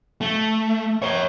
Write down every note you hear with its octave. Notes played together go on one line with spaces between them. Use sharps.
A3
A#4 C#5